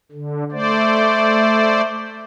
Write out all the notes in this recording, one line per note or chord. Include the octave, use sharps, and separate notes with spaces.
D3
A3 C5 D5